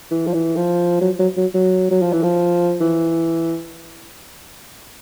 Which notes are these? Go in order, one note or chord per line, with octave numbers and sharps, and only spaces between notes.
E3
F3
E3
F3
F#3
F#3
F#3
F#3
F#3
F3
E3
F3
E3